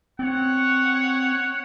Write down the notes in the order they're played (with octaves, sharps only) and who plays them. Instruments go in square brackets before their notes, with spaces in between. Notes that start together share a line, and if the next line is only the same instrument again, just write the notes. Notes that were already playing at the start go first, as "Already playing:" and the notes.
[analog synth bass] C4 [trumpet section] C#5 F#5